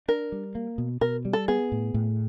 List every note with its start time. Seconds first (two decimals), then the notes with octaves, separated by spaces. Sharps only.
0.08 D4 A#4
0.32 G3
0.55 A#3
0.78 B2
1.01 B2 A#4
1.25 G3
1.33 A4
1.48 B3 G#4
1.72 A2
1.94 A2